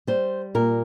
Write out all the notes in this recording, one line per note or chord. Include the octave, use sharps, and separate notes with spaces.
G3 C5
A#2 A#4